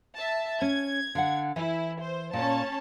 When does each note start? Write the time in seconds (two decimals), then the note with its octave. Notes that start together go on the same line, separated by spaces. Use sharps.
0.16 E5 A5
0.62 C#4 G#6
1.15 D3 F5 F#5
1.56 E3 E4
2.00 C5
2.33 A#2 C#4 A5